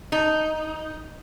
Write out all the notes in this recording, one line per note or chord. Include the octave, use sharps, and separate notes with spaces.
D#4